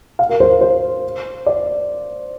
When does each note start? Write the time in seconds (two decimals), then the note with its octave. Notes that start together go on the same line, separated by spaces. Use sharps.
0.19 F5
0.29 A#4
0.40 C5
0.51 A#4
0.61 C5
1.47 D5